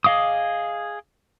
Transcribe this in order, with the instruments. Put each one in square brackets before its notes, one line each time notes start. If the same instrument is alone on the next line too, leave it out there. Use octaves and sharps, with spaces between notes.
[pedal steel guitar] G#4 D#5 F5 D6 D#6